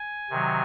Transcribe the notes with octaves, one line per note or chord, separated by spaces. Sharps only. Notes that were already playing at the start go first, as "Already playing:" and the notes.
Already playing: G#5
C3 D#3 F#3